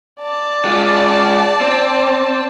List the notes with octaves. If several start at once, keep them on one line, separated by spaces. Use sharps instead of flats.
D5 A5
G#3 F4
C4